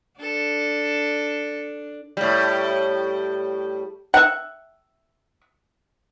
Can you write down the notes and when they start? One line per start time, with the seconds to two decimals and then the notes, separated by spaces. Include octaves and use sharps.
0.20 D4 A4
2.17 A2 G3
4.14 E5 F#5